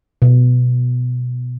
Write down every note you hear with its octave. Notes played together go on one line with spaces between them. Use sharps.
B2